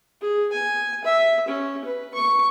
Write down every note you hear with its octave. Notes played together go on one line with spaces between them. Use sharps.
G#4
G#5
E5
C#4
B4
C#6